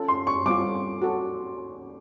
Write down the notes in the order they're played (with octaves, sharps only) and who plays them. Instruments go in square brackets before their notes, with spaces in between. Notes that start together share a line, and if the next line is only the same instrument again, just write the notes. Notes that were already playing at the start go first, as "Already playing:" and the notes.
Already playing: [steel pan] C#4 F4 A4
[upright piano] C6
C#6
[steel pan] G3 C4 F4 [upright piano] D6
[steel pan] F#4 A4 C#5